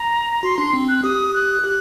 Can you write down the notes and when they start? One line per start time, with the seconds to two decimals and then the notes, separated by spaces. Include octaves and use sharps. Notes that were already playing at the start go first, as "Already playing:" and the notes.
Already playing: A#5
0.43 F#4 C6
0.58 D4 C6
0.73 C4
0.88 F#6
1.03 G4 D#6
1.34 F#6
1.64 G4